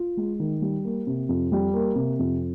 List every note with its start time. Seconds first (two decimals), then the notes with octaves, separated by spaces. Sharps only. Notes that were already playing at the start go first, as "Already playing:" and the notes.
Already playing: F4
0.17 G#3
0.39 D#3
0.62 G3
0.85 A#3
1.07 C3
1.29 F2
1.52 G3
1.74 A#3
1.96 C3
2.19 F2